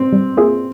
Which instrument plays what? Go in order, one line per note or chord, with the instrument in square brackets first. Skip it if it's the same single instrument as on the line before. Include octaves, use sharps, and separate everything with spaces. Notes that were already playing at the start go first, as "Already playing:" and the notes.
Already playing: [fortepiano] C4
[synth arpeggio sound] G3
A#3 F4 G#4 E5